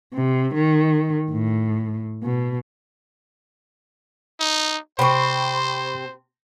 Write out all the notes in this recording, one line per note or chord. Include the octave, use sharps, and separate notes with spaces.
C3
D#3
A2
B2
D#4
C3 C4 C5 B5 C#6